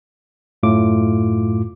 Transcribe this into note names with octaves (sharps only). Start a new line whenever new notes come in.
F#2 A2 A3 F4 D6